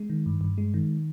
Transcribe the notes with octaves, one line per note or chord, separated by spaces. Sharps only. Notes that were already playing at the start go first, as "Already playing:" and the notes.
Already playing: G#3
D#3
G2
G2
G#3
D#3